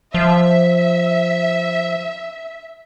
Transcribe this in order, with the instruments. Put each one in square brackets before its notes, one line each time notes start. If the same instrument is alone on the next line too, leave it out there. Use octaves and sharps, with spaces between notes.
[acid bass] F3 [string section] E5